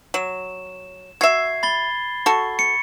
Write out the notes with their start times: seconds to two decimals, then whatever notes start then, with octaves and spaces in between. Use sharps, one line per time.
0.14 F#3 E7
1.21 F#4 E5 G#6 C7
1.63 B5 A6 G7
2.26 F#4 A4 C#6
2.59 C#7